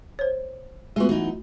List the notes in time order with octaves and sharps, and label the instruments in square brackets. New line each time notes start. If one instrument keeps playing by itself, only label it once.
[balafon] C5 C#5
[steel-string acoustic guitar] G#3 B3 [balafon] A3 F4 F#4
[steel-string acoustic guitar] E3 F#3 D#4